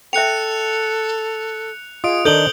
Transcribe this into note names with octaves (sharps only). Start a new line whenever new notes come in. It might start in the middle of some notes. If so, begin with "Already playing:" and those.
A4 E5 G5 F#6 C#7 F7
F4 G#4 D#5 D#6 D7
D#3 D4 D#4 A4 C5 G6 F#7 G7